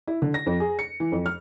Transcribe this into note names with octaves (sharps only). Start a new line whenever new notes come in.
E4
D3
A#6
F2
G#4
C#7
E3
F2
F6